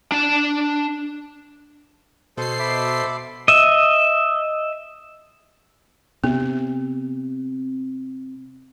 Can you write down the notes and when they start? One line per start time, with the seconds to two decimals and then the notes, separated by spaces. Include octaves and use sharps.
0.12 D4 A5
2.37 B2 A4 C5 C7
2.59 E5 B5 D6
3.48 D#5 E5
6.24 C3 B3